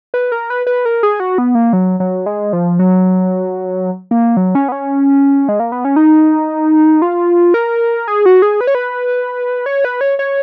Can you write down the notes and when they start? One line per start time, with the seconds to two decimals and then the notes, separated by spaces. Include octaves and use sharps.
0.14 B4
0.32 A#4
0.50 B4
0.67 B4
0.85 A#4
1.03 G#4
1.20 F#4
1.38 B3
1.55 A#3
1.73 F#3
2.00 F#3
2.26 G#3
2.53 F3
2.79 F#3
4.11 A#3
4.37 F#3
4.55 C#4
4.69 B3
4.72 C#4
5.49 G#3
5.60 A#3
5.72 B3
5.85 C#4
5.96 D#4
7.02 F4
7.54 A#4
8.08 G#4
8.26 F#4
8.42 G#4
8.61 B4
8.67 C#5
8.75 B4
9.66 C#5
9.84 B4
10.01 C#5
10.19 C#5